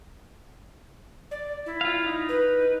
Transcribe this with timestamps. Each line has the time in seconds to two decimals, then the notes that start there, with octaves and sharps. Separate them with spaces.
1.31 D5
1.66 E4
1.81 F4 F5
2.06 D#4
2.29 B4